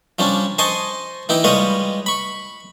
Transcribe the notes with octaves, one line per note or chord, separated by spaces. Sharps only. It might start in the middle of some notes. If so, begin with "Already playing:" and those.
F3 G3 C#4 D4
C5 D#5 G#5 A5 C6 C#6
E3 D#4 E4 G5
G3 G#3 F4 B4 C#5 D#5
B5 C#6